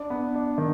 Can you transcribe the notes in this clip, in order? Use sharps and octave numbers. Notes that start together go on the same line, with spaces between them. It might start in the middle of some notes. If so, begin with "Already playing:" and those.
Already playing: D4
B3
D4
D#3